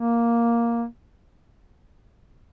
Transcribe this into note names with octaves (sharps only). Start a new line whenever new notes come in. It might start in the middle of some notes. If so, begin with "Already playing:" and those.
Already playing: A#3